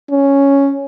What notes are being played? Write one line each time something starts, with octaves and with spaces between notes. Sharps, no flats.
C#4